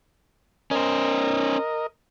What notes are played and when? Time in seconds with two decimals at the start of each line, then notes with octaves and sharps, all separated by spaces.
0.71 C#4 A#4 C5 D#5